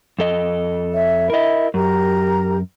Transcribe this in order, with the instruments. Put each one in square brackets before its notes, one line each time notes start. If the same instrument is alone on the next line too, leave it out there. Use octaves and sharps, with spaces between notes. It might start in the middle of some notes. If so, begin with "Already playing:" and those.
[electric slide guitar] F2 A4 D#5
[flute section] C#5 E5
[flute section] E4 E5 B5 [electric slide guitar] A#4 D#5
[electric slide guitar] F#2 [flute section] G4 A#4 A#5